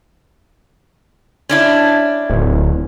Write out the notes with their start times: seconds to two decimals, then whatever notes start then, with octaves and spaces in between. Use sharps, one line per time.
1.49 C#4 D4 E4
2.30 D1